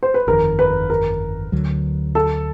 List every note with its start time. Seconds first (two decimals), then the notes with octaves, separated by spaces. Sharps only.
0.03 C5
0.14 B4
0.27 G1 F2 C3 D#3 A#4
0.59 B4
0.90 A#4
1.52 D2 D3 F#3
2.15 A4